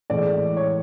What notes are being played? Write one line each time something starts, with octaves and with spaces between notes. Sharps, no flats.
A2 E3 G#3 D5
C#5